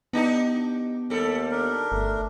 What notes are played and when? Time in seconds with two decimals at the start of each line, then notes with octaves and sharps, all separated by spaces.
0.13 B3 D4 D#4 G4
1.10 D#2 G3 A4
1.51 D4 A#4
1.92 G1 A3